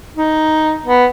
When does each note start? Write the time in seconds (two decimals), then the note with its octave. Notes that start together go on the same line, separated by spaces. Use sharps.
0.16 D#4
0.85 B3